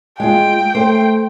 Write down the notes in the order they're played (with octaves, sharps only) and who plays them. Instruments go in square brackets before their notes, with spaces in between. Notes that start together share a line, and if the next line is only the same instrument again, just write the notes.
[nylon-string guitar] G#3 F4 [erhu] G5
[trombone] A3 [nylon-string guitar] C5